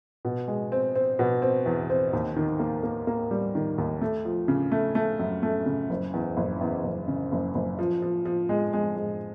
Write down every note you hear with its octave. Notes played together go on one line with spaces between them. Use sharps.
B2
G#3
C4
C4
B2
C4
E2
C4
D#2
D#3
A#3
A#3
A#3
G3
D#3
D#2
A3
F3
C#3
A3
A3
F#2
A3
C#3
F#1
E2
F#1
E2
F#1
C#3
F#1
F#1
F3
F3
F3
G#3
G#3
G#3